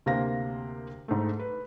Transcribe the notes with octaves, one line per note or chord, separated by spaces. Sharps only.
D2 C3 A#3 C5 F5 A#6
G#2 A3
B4